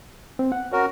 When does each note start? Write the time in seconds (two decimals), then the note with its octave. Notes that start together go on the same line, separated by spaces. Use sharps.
0.39 C4
0.52 F#5
0.72 C#4 F#4 A#4